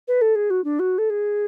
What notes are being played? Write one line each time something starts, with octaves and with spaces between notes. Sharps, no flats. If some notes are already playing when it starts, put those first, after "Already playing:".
B4
A4
G#4
F#4
D4
F#4
A4
G#4